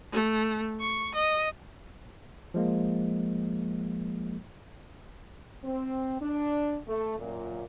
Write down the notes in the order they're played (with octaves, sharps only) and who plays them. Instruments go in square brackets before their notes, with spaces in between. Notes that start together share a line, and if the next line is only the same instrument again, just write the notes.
[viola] A3
C#6
D#5
[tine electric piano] F3 G#3 A#3
[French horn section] C4
D4
A3
F#2 A#2